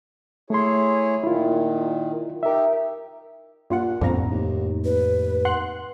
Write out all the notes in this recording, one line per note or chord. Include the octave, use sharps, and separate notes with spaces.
A3 E4 G#4 C#5 C6
A#2 D#3 E4 F4
D#4 G4 A#4 E5
G2 A#2 F4 F#5
G1 F2 A2 D3 F3 C4 A#5
D#2
D#2 B4
F#5 C6 F#6